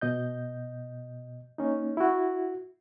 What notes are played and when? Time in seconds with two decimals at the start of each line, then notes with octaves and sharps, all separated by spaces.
0.01 B2 D#5 G6
1.58 A#3 C#4 D#4
1.97 E4 F#4